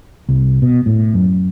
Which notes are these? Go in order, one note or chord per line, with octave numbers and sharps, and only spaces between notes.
C2
B2
A2
F#2